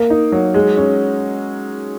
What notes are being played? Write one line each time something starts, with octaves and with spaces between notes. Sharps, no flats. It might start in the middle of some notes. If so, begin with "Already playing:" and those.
Already playing: A#3
D#4
F#3
G#3
C#4